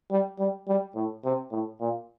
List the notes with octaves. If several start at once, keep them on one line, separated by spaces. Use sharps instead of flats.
G3
G3
G3
A2
C3
A2
A#2